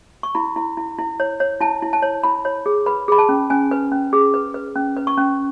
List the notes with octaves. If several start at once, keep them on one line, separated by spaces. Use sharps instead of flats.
C#6
E4 B5
E4
E4
E4
C#5
C#5
E4 A5
E4
A5
C#5
E4 B5
C#5
G#4
B4 B5
G#4 B5
A5
C#4
C#4 G#5
B4
C#4
G#4
B4
B4
C#4
B4
C#6
C#4